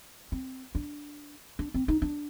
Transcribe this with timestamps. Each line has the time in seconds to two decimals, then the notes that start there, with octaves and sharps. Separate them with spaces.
0.32 C4
0.75 D4
1.59 D4
1.74 C4
1.88 D#4
2.02 D4